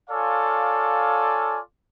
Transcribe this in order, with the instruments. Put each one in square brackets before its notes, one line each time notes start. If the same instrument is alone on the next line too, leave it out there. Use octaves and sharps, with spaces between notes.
[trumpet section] F4 A4 C#5 D5 F5 G#5